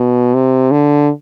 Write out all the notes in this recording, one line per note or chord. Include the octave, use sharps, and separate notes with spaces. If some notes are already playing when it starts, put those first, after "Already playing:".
Already playing: B2
C3
D3